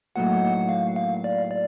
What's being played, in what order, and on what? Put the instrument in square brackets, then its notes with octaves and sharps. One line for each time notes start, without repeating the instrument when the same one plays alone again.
[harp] A2 F#3 A#3 D#4 F#4 [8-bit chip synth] F#5
[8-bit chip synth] F5
F5
D5
D5